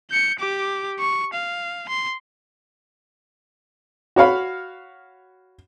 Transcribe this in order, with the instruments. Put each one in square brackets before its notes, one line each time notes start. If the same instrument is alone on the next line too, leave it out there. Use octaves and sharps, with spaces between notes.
[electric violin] G6 C#7
G4 D6
C#6
F5
C6
[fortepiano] F#4 C#5 F5 B5